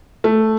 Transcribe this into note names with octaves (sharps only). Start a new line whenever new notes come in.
A3